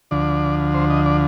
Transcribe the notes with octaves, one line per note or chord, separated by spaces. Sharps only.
D2 D3 F3 D5
C5
D#5
D5